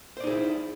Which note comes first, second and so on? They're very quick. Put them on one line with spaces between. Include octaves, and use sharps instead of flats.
C5 D5 D#4 G#4 E4